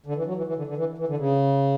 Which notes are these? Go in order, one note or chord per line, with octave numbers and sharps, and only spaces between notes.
D3
E3
F#3
E3
E3
D3
D3
E3
E3
D3
C#3